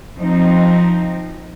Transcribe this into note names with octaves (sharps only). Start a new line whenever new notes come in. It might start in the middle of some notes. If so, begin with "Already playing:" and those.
F3 C4 D#4